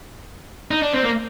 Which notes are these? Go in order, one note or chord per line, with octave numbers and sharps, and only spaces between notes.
D#4
D4
C4
A#3